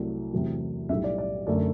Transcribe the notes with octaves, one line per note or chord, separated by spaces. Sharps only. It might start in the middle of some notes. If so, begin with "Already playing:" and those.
Already playing: C2 C3 F#3 A3
E2 C3 F#3 A3
B1 A2 G3 E5
D5
D5
F#2 D3 A3 D5